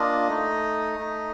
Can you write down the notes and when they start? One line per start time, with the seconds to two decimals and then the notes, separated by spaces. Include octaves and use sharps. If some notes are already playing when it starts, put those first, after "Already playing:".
Already playing: A#3 D4 F4 D#5
0.28 A3 D#4
0.99 A3 D#4